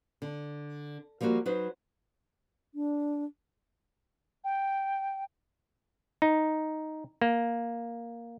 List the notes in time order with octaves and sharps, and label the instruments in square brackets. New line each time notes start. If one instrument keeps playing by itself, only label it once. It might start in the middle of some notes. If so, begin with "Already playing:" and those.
[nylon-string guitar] D3
F3 G3 A#3 F4 F#4
F#3 D#4 B4 C5
[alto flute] D4
[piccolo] G5
[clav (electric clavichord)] D#4
A#3